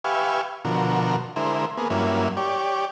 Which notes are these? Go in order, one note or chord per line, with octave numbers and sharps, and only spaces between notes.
G4 B4 E5 F5 G#5 C#6
B2 D3 F3 F#4 A#4
D3 G#3 E4 A#4 C5
A#3 B3 G#4
G2 F#3 A#3 C#4 E4
G4 C#5 D5